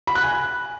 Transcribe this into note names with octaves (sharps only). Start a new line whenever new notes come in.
B5
F#6
G#5